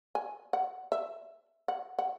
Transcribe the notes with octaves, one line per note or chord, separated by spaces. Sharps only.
G#5
F#5
E5
F#5
F#5